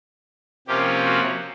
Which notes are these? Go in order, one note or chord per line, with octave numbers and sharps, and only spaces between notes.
C3 F3 A#3 C#4 G4
F#4